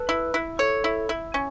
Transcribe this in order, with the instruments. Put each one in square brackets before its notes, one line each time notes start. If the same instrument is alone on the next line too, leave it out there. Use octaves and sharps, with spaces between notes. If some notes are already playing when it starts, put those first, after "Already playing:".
Already playing: [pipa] A4 [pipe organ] B4
[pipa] E4
E4
[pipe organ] A4 [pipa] C#5
[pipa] E4
E4
C#4